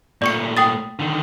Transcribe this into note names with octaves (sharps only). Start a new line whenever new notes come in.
A#2 A3 D5 C#6 C#7
G5 D#6 A6
D3 D#3